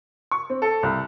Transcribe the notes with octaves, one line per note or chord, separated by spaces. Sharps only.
C#6
C4
A4
C2